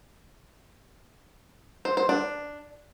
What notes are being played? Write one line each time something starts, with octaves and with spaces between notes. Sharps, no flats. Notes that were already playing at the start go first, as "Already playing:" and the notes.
C5
C5
D4